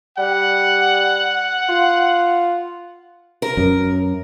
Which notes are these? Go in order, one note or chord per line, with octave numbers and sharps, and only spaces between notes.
G3 F#5
F4
A#4
F#2